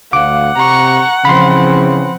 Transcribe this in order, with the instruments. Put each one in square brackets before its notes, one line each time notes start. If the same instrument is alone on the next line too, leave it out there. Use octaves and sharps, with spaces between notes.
[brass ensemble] D2 F5 [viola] F#5 [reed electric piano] D6
[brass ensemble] C3 [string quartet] A#5 C#6
[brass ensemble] C#3 E3 [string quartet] F3 C4 [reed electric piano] B5 C6